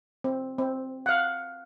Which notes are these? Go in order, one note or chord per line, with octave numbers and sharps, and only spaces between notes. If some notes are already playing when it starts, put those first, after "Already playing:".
C4
C4
F5 F#5